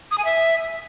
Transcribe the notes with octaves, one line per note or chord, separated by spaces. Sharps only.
D#6
G#5
E5